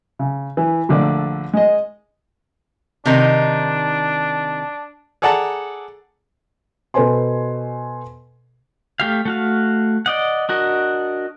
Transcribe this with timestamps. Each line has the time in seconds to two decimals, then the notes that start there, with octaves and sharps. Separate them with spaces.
0.19 C#3
0.57 E3
0.89 A#1 D3 A3 D5
1.53 G#3 D#5
3.06 C3 D#3 D4 D#4
5.22 G#4 A4 D5 F#5 A5 A#5
6.94 B2 A4 B4 C5 G#5 C6
9.00 A3 G4 F5
9.25 A3 F#4 F5
10.06 D5 D#5 F#5
10.49 D4 F#4 A#4 D#5